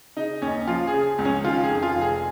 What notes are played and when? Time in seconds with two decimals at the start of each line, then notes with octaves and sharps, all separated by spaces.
0.17 C#3 D#4
0.42 D#2 C#4
0.67 F3 F4
0.87 G#4
0.94 C#3
1.19 C#2
1.25 C#4
1.44 D#3 F4
1.63 G#4
1.69 F2
1.83 F4
1.95 F1
2.01 G#4